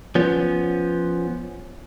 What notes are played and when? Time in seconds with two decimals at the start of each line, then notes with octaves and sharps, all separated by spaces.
0.15 F3 B3 C#4